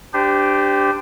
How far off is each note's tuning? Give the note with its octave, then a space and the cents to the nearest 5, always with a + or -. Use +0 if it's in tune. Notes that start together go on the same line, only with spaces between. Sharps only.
D4 +0 G4 +0 C5 -30